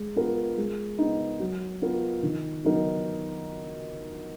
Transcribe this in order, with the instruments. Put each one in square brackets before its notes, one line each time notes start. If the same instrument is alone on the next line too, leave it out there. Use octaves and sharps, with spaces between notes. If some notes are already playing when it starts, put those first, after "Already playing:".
Already playing: [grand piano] G#3
B3 F4 A#4
G#3
B3 D#4
F#3
B3 F4 A#4
D#3
F#3 B3 D#4 A#4